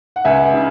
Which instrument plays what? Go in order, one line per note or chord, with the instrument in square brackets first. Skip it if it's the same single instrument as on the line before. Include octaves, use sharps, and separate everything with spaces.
[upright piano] F#5
C#2 E5 G#5
C#3